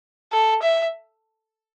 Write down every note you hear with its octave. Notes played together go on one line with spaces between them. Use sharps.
A4
E5